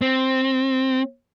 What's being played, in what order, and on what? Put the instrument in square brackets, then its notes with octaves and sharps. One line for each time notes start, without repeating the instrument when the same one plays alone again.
[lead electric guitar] C4